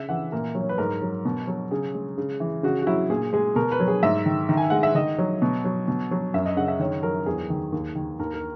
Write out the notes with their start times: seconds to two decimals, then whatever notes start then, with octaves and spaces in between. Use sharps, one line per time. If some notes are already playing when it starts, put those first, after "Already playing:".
Already playing: C#3 E5
0.09 E3 F#5
0.32 A#2 A#4
0.55 F#3
0.61 C#5
0.69 B4
0.78 G#2 A#4
1.02 F#3
1.25 B2
1.47 F#3
1.71 C#3 G#4
1.95 G#3
2.18 C#3
2.40 E3
2.63 C#3 F#4
2.82 F#4
2.87 F#3 E4
3.10 A#2 G#4
3.33 G#3 G#4
3.56 B2 A#4
3.72 B4
3.80 F#3
3.88 G#4
4.03 G#2 E5
4.26 D#3
4.49 D#3
4.57 G#5
4.70 G#3 F#5
4.83 E5
4.95 D#3 D#5
5.19 F#3
5.42 B2
5.65 F#3
5.88 B2
6.11 F#3
6.34 F#2 E5
6.46 D#5
6.56 C#3 F#5
6.68 E5
6.80 D#3 C#5
7.03 F#3 A#4
7.26 E2 G#4
7.50 D#3
7.72 D#2
7.95 D#3
8.19 D#2 A#4
8.34 A#4